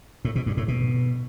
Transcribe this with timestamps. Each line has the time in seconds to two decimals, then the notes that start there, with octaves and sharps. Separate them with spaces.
0.25 A2
0.36 B2
0.46 G2
0.57 A2
0.68 B2